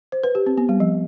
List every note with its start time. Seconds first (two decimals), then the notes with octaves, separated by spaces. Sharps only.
0.12 C5
0.24 B4
0.35 G4
0.46 C4
0.58 B3
0.69 G3
0.80 F3